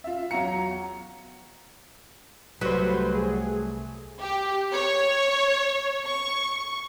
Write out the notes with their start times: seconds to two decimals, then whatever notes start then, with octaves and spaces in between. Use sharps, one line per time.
0.04 F4 E5
0.31 E2 F#3 C#5 F5 A#5 C#7
2.61 C2 F#3 G3 A3 F#4 B4 C5
3.15 G#4
4.20 G4
4.73 C#5
6.04 C#6